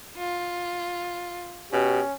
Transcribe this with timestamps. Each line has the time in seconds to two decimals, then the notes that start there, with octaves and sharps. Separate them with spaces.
0.18 F4
1.73 B2 C#4 G4